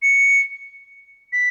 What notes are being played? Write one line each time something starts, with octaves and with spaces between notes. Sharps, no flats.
C#7
B6